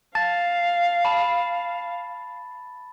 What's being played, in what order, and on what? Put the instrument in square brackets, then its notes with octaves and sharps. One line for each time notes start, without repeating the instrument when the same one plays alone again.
[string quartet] F5 [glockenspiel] A5 A6
[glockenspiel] A5 B5